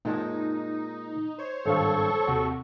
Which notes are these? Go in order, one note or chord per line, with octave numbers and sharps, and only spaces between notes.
A#2 G#3 D#4 A5
C5 C#5
G#1 G2 A4 F5 C#6
D#2 C3 F#4